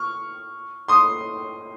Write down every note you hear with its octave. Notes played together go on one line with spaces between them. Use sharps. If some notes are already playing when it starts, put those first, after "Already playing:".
Already playing: C#6 F6
C6 D#6